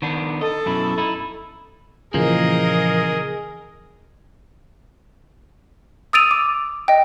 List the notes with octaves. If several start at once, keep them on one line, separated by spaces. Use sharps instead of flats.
D#3 B3 D4
A4 D#5
F#2 B2 E4
D#4 E4
A#2 C#3 E3 F3 A#3 G#4 A#4 D#5
D#6 E6 A6 D7 D#7 F7
D6
D#5 G5